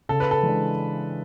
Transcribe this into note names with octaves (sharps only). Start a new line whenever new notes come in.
C#3 A4
B4
A4
E3 G#3 D4